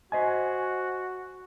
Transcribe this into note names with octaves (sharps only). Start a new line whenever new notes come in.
F#4 C5 D#5 G#5